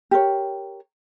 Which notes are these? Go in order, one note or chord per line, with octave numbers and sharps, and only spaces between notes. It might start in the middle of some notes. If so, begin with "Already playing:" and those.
G4 A#4 C#5